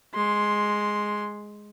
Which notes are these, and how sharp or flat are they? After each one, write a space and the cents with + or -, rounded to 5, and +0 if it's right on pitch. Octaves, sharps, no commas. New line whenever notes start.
G#3 +0 C6 +0